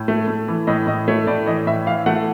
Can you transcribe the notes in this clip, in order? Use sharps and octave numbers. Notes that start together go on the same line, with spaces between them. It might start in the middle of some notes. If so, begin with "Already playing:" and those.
Already playing: A2
A3
A3
E3
A2 D#5
A2 D#5
A3 C#5
A2 D5
E3 D#5
A2 E5
E3 F5
A3 F#5